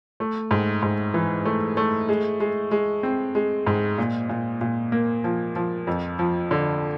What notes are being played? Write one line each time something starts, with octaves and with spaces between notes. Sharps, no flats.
A3
G#2
G#2
E3
A3
A3
G#3
G#3
G#3
C4
G#3
G#2
A#2
A#2
A#2
A#3
F3
F3
F2
F3
D3